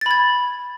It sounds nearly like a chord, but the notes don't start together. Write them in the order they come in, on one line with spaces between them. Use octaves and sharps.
A6 B5 G#6